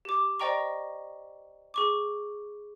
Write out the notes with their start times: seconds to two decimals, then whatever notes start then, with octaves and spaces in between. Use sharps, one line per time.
0.05 G4 D6
0.40 C5 D5 D#5 G5 A#5 C#6
1.74 G#4 C#6 D6